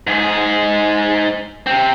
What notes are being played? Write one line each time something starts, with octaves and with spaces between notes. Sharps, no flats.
G#2 G#4
C3 C4